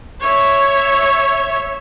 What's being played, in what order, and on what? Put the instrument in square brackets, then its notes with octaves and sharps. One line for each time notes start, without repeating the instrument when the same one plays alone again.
[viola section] C#5 E5